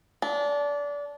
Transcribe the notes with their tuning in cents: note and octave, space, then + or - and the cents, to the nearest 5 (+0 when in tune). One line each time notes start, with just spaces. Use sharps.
D4 -25